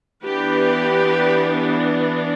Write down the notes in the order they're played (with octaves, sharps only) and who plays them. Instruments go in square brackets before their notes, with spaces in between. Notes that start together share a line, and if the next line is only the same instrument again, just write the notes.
[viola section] E3 B3 D4 G4 B4